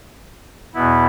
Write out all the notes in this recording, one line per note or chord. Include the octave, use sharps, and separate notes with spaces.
E2 B2 B3 E4